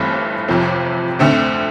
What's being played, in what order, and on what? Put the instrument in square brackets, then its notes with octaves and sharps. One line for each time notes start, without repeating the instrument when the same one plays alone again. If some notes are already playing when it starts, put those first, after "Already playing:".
Already playing: [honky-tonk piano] G1 G2 E3 A3 C4
G1 F2 C3 F3 C4
D2 D3 A3 C4